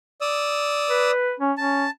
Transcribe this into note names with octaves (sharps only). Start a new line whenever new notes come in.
D5 D#6 E6
B4
C#4
C#4 A5